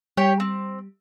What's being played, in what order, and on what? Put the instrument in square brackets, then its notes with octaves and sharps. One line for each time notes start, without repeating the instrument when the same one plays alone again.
[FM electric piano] G3 [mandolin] G4 C#5
[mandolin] C4